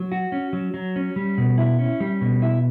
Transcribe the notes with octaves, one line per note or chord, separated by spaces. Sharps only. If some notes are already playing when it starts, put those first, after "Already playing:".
Already playing: F#3
F#4
C#4
F#3
F#3
C#4
G3
B2
E4
C#4
G3
B2
E4